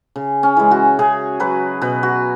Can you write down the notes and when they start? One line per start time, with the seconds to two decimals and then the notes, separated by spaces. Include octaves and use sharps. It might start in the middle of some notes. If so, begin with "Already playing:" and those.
0.16 C#3
0.43 C#4
0.57 E3 G#3
0.71 F#4
0.99 C#3 G#4
1.40 F#3 B4
1.82 B2 B4
2.03 F#4